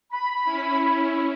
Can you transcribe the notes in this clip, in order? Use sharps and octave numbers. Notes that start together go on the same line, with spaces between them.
B5
C#4 E4